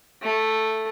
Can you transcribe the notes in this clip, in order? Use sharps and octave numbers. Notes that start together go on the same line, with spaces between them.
A3